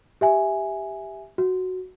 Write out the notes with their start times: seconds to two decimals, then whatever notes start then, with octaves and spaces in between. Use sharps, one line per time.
0.21 G4 E5 G#5
1.38 F#4